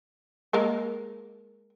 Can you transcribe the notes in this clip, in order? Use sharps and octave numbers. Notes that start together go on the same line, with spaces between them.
G#3 A#3 A#4